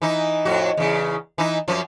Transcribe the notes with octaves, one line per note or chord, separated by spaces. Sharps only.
E3 D#4
F2 A2 F#4
E2 C#3
E3 D#4
F#2 F3